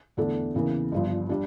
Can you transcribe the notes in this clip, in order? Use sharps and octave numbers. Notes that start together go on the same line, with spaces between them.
E2 D3 A3 D4
E2 C#3 E3 A#3
G1 G2 F3
G3 D4